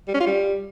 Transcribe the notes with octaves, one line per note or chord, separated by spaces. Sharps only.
G3
C#4
F4
G3